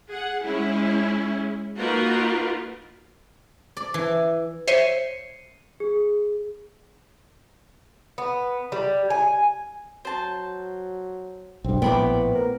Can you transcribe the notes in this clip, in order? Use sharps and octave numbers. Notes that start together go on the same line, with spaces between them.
G#4 F#5
G#3 C#4 E4
A#3 D#4 F4 F#4 A#4 B4
D5
E3
C5 C#5 E5 C7 C#7 D#7
G#4
B3
G3
G#5
F#3 C5 A5
B1 G2 C4
A#1 A2 B3 G5 B5 D6
A#4